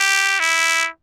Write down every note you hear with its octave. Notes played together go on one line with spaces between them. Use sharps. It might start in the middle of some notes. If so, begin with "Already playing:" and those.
Already playing: G4
E4